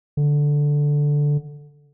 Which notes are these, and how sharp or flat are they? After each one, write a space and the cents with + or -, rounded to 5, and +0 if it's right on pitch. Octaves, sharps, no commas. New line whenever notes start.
D3 -5